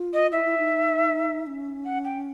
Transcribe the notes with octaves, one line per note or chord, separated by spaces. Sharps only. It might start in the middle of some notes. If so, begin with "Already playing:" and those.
Already playing: F4
D#5
E4 E5
E4
D#4
C#4
F#5
G5